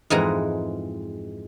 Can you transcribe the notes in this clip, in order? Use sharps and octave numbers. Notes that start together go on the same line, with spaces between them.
F2 G#2 E3 G#3 F#4 A#5